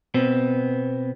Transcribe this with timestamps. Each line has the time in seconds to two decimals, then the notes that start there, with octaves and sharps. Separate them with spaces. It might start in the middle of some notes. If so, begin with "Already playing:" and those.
0.14 B2 B3 C4